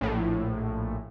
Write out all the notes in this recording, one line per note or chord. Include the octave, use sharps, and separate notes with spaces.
A#1 A2